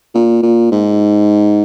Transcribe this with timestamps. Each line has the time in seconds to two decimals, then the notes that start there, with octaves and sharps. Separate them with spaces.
0.14 A#2
0.43 A#2
0.71 G#2